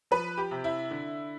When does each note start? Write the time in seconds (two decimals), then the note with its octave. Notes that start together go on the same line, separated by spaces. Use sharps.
0.11 F3 B4
0.38 G4
0.51 C3
0.64 E4
0.91 D3